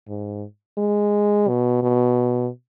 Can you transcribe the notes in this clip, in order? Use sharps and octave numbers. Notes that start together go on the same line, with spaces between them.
G#2
G#3
B2
B2